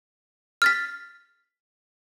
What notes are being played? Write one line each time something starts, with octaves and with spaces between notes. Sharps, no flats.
F6 A6 B6